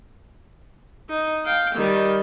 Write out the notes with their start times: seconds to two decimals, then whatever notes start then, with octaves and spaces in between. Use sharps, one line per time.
1.09 D#4
1.45 F5 G5
1.75 D#3 G3